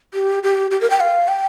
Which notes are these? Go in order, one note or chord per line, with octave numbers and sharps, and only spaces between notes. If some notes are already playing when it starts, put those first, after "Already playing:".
G4
G4
G4
A#4
G5
F5
G5